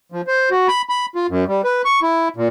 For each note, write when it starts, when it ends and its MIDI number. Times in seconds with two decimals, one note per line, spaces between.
0.12 0.21 53
0.27 0.49 72
0.51 0.68 66
0.68 0.82 83
0.89 1.06 83
1.15 1.27 65
1.29 1.44 42
1.48 1.62 55
1.64 1.82 71
1.85 2.00 85
2.03 2.28 64
2.37 2.48 46